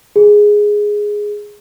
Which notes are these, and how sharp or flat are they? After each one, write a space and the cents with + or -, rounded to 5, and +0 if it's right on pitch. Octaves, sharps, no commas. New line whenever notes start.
G#4 +0